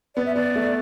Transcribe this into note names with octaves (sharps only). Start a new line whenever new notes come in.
B3 D5
E5
B3 D5
A3